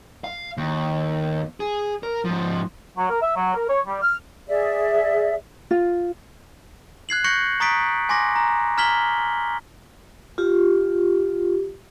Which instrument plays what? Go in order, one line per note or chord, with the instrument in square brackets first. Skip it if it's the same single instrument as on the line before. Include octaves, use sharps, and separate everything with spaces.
[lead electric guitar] F5
D#2
G#4
A#4
G#2 F3
[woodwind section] F#3
A#4
E5
F#3
A#4
C#5
G3
F6
[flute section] G#4 D5 E5
[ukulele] F4
[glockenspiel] F#6 G#6 C7 F#7
C#6 F#6 G6 A#6 C#7 F#7
A#5 C#6 D#6 A6 B6 D7
G#5 C6 D6 A#6
A#5
A#5 F6 G#6 B6 F#7 G7
[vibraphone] F4 G4